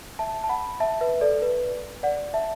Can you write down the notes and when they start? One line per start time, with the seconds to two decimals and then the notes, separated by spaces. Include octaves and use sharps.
0.19 E5 A5
0.44 A5
0.49 F#5 B5
0.80 E5 A5
1.01 B4 E5
1.21 A4 D5
1.42 B4
2.03 D5 F#5
2.34 E5 A5